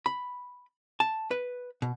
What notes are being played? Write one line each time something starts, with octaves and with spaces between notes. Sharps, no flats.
B5
A5
B4
B2